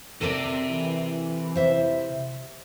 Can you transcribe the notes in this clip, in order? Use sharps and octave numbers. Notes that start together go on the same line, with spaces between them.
C3 A4 A#4 D5
E3
C5 E5